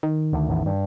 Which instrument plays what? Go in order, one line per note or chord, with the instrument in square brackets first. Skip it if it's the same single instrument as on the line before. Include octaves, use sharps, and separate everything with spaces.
[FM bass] D#3
[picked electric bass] D2
A1 E2
G2